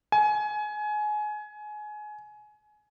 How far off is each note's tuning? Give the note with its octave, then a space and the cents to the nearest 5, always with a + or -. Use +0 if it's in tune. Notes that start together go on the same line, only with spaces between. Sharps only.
G#5 +25